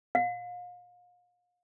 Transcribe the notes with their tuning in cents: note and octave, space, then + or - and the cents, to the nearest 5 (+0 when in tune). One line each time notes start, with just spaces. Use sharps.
F5 +35